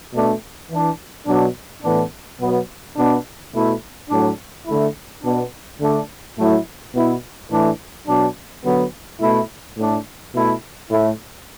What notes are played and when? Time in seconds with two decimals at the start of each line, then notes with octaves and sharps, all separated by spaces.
0.12 B2 A3 D4
0.69 E3
0.74 D4
1.26 B2 F#3 D4
1.82 A2 E3 B3 D4
2.39 B2 F#3 B3
2.95 B2 B3 D4
3.53 B2 A3 E4
4.09 A2 F#3 D4
4.66 D3 A3 E4
5.23 B2 B3 D4
5.79 D3 A3 D4
6.36 A2 F#3 A3 E4
6.93 B2 B3 E4
7.49 A2 E3 A3 D4
8.06 B2 F#3 D4
8.63 D3 F#3 B3
9.20 B2 A3 E4
9.77 A2 A3 D4
10.33 B2 A3 E4
10.89 A2 A3 E4